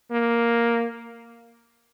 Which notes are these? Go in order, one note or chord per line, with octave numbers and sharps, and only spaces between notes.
A#3